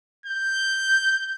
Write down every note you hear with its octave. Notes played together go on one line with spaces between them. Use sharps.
G6